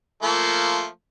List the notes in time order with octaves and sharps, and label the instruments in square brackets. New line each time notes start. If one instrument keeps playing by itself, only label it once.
[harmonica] F3 A3 A#3